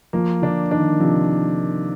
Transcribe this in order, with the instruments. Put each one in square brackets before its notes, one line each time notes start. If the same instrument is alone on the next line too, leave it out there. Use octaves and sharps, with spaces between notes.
[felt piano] F3 [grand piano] A#3
[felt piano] D3 [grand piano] D4
[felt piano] D#3 [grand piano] D4
[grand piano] C3 [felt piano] F3